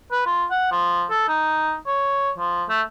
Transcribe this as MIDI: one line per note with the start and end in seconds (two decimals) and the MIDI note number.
0.12 0.23 71
0.26 0.45 65
0.51 0.69 78
0.72 1.05 53
1.10 1.26 69
1.28 1.75 63
1.87 2.30 73
2.38 2.64 53
2.69 2.82 57